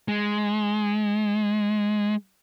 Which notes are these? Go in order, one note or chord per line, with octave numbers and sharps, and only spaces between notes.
G#3